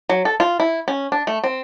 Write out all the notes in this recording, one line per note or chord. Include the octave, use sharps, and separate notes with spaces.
F#3
A4
F4
E4
C#4
D4
A3
C4